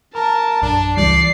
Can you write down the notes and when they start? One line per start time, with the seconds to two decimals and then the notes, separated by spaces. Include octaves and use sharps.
0.15 A#4 A5 A#5
0.62 A#1 F#2 D4
0.97 C#2 E3 G3 D5 C7